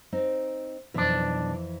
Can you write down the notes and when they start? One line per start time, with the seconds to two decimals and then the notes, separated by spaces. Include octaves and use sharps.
0.12 C4 D#4
0.94 B1 F2 E3 D4